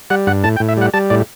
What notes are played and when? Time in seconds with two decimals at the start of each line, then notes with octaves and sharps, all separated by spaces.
0.10 G3 F#5
0.27 G2 F#5
0.44 A2 A5
0.56 G5
0.60 A2
0.69 E5
0.77 G3 F#5
0.94 G3 A5
1.10 A2 D5